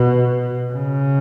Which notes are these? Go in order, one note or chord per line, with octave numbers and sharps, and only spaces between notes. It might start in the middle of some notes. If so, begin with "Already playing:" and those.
Already playing: B2
C#3